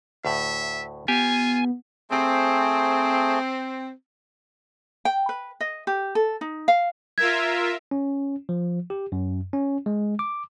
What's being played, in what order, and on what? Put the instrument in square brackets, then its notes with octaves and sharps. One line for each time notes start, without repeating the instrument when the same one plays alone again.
[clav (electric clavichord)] D2 A2 [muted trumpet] E5
[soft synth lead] B3 [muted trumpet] F4 [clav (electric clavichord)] G4 [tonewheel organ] G#5
[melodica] A3 G#4 [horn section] C4
[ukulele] G5
B4
D#5
G4
A4
D#4
F5
[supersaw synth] F4 A#4 E5 [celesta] G#6
[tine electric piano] C#4
F3
G4
F#2
C#4
G#3
D6